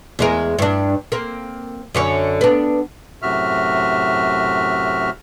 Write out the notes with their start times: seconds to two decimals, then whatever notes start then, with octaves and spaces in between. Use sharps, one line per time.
0.19 E2 G#3 A#4
0.59 G2 D4
1.12 A#3 C4
1.95 F#2 D3 C#5
2.41 B3 D4
3.22 F#2 A2 C3 F#4 E5 F6